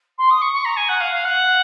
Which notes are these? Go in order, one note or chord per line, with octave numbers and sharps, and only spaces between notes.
C6
D#6
C#6
C#6
A#5
G#5
F#5
F5
F5
F#5